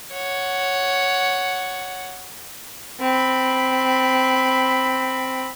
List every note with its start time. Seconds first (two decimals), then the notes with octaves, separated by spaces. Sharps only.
0.14 C#5 F#5
3.00 C4 B5